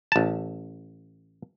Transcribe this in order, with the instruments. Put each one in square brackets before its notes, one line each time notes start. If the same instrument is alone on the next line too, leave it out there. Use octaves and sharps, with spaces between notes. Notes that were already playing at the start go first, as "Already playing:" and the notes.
[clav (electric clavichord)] A1 A5